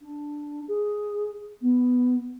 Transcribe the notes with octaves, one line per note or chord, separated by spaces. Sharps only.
D4
G#4
B3